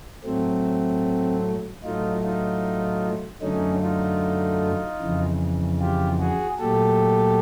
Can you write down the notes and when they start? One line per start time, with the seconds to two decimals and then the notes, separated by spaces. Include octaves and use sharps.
0.25 A2 F#3 A3 C4
1.83 A2 F#3 A3 D#4 F4
2.23 D#4 F4
3.42 F#2 D3 F#3 A3 C#4 D#4
3.81 D#4 F4
5.01 F2 C#3 E3
5.80 F4 G4
6.19 F#4 G#4
6.59 A#2 F#3 A3 G4 A4